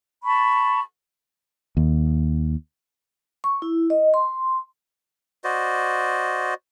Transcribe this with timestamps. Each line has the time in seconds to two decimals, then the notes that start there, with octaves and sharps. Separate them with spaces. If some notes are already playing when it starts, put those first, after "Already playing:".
0.24 A5 B5 C#6
1.77 D#2
3.44 C#6
3.62 E4
3.90 D#5
4.14 C6
5.44 F#4 C5 D5 D#5